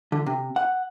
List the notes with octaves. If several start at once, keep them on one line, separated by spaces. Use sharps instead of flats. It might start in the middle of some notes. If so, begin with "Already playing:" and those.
D3
C3
F#5